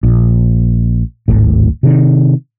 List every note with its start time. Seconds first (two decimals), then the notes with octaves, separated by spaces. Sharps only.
0.03 A#1
1.28 D1 G#1 A2
1.83 C3 D#3